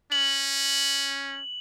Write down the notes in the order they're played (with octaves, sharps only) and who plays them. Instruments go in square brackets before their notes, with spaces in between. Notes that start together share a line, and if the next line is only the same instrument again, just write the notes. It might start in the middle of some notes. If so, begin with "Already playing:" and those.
[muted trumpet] C#4 [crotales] F#7